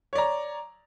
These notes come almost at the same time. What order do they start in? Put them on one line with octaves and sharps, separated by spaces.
C#5 D5 A#5